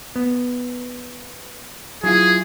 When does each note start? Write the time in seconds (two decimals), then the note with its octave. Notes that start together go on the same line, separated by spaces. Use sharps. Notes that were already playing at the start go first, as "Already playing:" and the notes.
0.16 B3
2.04 F#3 E4 F4 G#4